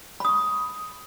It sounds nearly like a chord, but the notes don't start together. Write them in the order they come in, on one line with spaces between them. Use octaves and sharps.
B5 D#6 C#6